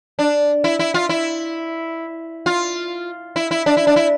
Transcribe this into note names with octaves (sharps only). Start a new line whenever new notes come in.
D4
E4
E4
F4
E4
F4
E4
E4
D4
E4
D4
E4